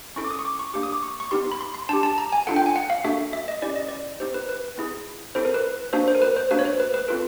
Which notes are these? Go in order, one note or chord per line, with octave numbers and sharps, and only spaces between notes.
C#4 E4 A4 C#6
D6
D#6
C#6
D6
C#6
A#3 D4 G4 D6
D#6
D6
C#6
C#6
B3 D#4 G4 C6
B5
C6
C6
D4 G4 A5
A5
A#5
G#5
D4 F4 A4 F#5
G5
G#5
F#5
F5
A#3 D4 F#4 A4 E5
E5
D#5
C#4 E4 G4 D5
D#5
D5
B3 D#4 G4 C5
B4
B4
B3 E4 G#4
C4 E4 A4 C5
A#4
B4
A#3 D4 F#4 C5
C5
A#4
B4
C5
A#3 D4 F#4 B4
C#5
C5
B4
B4
C4 F4 A4 B4